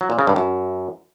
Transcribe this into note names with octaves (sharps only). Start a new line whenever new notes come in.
F#3
A#2
C#3
G2
F#2